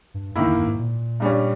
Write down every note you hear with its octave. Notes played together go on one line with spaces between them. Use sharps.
G2
G2 D#3 A#3 E4
E2
G2
G#2
A#2
G2 G3 C#4